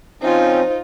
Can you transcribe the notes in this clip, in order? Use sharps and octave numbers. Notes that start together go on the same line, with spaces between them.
F3 C4 C#4 D#4 F4 C5